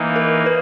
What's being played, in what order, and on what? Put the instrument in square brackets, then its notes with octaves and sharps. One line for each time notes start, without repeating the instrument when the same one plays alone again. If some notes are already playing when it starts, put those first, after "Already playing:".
Already playing: [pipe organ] E3 A#3 D#4
[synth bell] A#4
B4